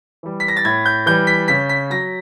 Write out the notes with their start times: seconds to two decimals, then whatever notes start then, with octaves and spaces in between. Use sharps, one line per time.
0.23 E3 G3
0.40 B6
0.48 A#6
0.57 A6
0.65 A2 G#6
0.86 G6
1.06 E3 G3 G6
1.27 B6
1.48 C#3 B6
1.69 B6
1.90 F#3 A#6